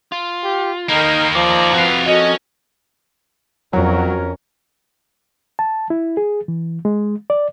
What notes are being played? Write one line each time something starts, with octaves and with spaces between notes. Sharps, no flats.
F4
G4
D#3 A#3 D#4 A#4 G5 B5
F3 D5 A#5
F2 F#4 B4 F5
C#4 F#4 A4 A#4 D#5
F2 F#3 C#4 A#4
A5
E4
G#4
E3
G#3
D5